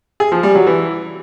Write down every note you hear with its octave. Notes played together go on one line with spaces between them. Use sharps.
G#4
F3
G3
F#3
E3